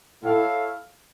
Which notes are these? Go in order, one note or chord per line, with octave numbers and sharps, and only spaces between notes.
A2 E4 A4 C#5 F5